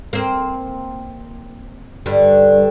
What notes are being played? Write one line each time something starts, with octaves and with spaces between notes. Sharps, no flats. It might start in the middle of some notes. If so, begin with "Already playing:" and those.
A#3 C4
G2 D3